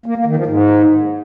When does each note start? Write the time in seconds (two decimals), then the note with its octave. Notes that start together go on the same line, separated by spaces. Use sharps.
0.06 A#3
0.16 A#3
0.26 D#3
0.36 F3
0.46 G#2